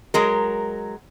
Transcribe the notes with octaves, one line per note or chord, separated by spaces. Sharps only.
F#3 G#3 A#4